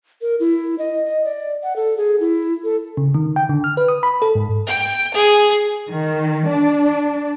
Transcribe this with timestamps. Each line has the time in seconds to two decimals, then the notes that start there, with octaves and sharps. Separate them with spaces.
0.22 A#4
0.40 E4
0.79 D#5
1.05 D#5
1.25 D5
1.63 F#5
1.76 A4
1.97 G#4
2.20 E4
2.64 A4
2.97 C#3
3.14 D#3
3.36 G5
3.49 D3
3.64 F6
3.77 B4
3.88 D#6
4.03 B5
4.22 A4
4.35 G#2
4.66 G5
5.14 G#4
5.89 D#3
6.49 D4